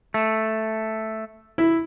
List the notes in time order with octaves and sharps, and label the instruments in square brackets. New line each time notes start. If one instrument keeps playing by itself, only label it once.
[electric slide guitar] A3
[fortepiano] E4